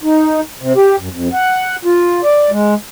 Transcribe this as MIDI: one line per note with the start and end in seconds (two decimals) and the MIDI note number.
0.03 0.41 63
0.61 0.73 48
0.76 0.96 67
0.99 1.09 42
1.12 1.28 41
1.33 1.76 78
1.85 2.21 65
2.24 2.50 74
2.50 2.74 56